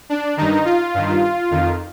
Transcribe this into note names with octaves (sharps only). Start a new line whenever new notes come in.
D4
G2 D#3 D#4
F4
G2 D#3
F2 D#3